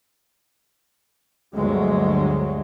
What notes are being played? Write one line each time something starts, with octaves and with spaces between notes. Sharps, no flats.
G1 D2 F#3 G#3